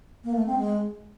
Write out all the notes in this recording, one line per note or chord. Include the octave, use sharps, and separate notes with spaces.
A#3
A3
C4
G#3